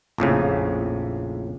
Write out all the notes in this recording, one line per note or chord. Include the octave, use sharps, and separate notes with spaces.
A#1 F2 A2 C#3